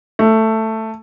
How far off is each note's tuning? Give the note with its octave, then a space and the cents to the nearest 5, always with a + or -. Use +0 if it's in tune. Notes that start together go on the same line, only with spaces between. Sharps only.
A3 +10